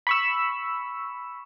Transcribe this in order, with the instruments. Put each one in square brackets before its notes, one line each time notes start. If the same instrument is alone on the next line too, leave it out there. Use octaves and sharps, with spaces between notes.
[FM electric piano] B5 C#6 E6